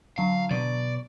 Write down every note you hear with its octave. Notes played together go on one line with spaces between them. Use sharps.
D3 F#3 F5
B2 D5